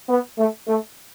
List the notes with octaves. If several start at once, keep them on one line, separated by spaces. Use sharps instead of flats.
B3
A3
A3